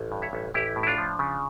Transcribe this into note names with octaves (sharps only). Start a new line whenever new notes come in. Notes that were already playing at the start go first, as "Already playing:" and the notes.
Already playing: A1
G2
C#5 E5
A1
A1 E4 G4
A2
E4
D4 F4
F3
C#3